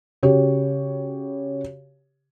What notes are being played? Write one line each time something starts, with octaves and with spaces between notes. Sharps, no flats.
C#3 F#4 G4 C#5